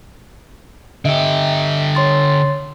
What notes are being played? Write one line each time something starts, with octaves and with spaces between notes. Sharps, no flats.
D3 G4 D#5 E5
C#5 C6 A6